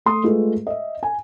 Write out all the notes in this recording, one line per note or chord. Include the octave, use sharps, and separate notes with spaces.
A3 C6 D#6
G#3 A3 F4 B4
D#5 E5
G#5